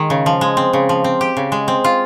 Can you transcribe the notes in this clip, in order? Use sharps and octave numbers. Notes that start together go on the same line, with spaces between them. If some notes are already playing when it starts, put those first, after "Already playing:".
Already playing: D#3 G#3
C#3
F3
G#3
C4
C#3
F3
C4
G4
C#3
G#3
C4
F4